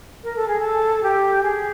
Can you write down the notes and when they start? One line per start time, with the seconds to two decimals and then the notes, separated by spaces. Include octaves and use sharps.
0.23 A#4
0.36 A4
0.48 G#4
0.60 A4
1.03 G4
1.43 G#4